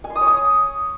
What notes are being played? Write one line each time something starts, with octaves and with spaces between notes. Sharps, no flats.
G#5
C6
D#6
C#5
D#6